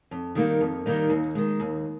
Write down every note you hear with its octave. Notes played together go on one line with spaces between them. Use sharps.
F2
D#3 G3 A#3 D#4
F2
D#3 G3 A#3 D#4
D#2
D#3 G#3
D#2